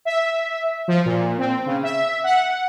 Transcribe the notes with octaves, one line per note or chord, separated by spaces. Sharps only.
E5
F3
A#2
C4
C#3
E5
F#5